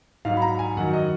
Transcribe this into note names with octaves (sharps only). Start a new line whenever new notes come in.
G#2 F#3 F5
B5
A#5
G#5
F#2 D#3 F#3 F#5
D#5